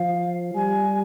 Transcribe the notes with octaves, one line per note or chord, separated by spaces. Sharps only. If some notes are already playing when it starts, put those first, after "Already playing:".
Already playing: F3 F5
G3 G#5